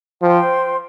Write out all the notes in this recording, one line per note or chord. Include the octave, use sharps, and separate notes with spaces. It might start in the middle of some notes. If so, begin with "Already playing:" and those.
F3 C5 G5 C6